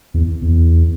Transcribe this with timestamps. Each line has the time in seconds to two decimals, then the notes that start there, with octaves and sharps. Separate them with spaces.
0.14 E2
0.42 E2